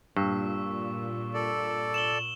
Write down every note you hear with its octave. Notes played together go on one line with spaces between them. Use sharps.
G2 A#2 C#6 E6
A4 D5
E7 F#7 G7